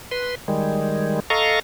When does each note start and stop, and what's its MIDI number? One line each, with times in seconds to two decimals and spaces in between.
0.11 0.35 71
0.11 0.35 84
0.48 1.20 51
0.48 1.20 55
0.48 1.20 56
1.30 1.60 69
1.30 1.60 75
1.30 1.60 77
1.30 1.60 82
1.30 1.60 85